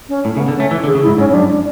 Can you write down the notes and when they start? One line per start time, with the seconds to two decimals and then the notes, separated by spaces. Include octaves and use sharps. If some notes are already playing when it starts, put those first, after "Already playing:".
0.09 C#4
0.25 A2
0.33 A3
0.37 C#3
0.40 B3
0.48 D3
0.56 A3 C#4
0.71 E3
0.84 D3
0.87 G#4
0.95 C#3
1.02 G#2 E4
1.18 G#2 C#4
1.30 C#4
1.34 F#2 D4
1.50 D4